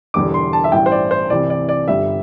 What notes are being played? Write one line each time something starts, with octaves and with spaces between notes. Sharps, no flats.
E1 E2 D3 G3 D6
C6
A5
E5
A1 G2 E3 G3 G5
C5
D5
C5
C2 C3 E3 D5
D5
D5
G1 G2 D3 G3 E5